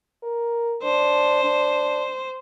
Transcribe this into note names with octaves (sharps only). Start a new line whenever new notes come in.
A#4
D4 C5
D4